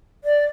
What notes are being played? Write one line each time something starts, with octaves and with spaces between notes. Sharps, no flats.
D5